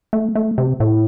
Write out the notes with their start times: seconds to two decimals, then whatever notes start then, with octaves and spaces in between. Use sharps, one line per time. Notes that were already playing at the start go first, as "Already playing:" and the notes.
0.13 A3
0.35 A3
0.58 C3
0.80 A2